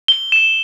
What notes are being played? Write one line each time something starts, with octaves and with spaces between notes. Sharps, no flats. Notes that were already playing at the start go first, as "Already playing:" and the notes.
G7
E7